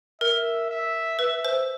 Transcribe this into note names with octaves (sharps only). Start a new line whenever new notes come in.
A#4 E5
E5
B4 E5
C5